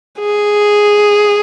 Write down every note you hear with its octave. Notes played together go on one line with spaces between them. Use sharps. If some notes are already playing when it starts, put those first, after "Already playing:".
G#4